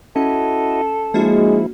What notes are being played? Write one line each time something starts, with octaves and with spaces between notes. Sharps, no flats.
C#4 E4 F#4 A4 D#5
F3 G#3 A#3 D4 E4 F#4